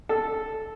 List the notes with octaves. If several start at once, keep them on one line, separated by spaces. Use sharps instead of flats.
A4